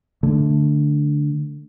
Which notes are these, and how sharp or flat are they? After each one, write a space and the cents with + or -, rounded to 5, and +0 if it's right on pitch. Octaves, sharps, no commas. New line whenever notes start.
D3 +0 A3 +0